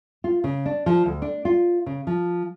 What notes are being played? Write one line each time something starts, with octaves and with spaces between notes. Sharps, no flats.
F4
C#3
D4
F3
D2
D4
F4
C#3
F3